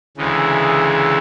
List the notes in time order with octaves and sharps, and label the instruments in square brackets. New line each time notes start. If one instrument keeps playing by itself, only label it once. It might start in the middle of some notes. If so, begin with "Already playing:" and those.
[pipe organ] D2 C#3 E3 G#3